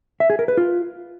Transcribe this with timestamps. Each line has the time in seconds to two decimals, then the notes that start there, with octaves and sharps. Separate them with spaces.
0.20 E5
0.30 G#4
0.39 A#4
0.48 B4
0.57 F4